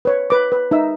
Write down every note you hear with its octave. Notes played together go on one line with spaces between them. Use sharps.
B4 C#5
B4 D6
B4
D#4 E5 E6